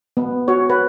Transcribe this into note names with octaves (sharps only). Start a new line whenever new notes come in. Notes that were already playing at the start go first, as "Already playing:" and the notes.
B3
F#4 C#5
B4